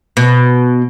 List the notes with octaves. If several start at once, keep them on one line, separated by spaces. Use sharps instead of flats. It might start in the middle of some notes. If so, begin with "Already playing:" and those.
B2